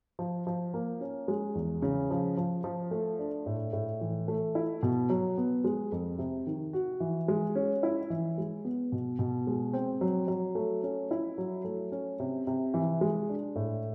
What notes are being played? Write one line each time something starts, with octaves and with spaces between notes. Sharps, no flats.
F3
F3
A#3
C#4
G#3
E2
C#3
F3
F3
F3
A3
D4
A2
A2
E3
A3
E4
B2
F#3
B3
G#3
F2
C3
D#3
F#4
E3
G#3
C#4
E4
E3
G#3
B3
B2
B2
G#3
C4
F#3
F#3
A3
C#4
E4
F#3
A3
C#4
C3
C3
E3
G#3
D4
A2